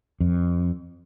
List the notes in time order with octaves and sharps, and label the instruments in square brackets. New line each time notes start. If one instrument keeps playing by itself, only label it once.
[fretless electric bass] F2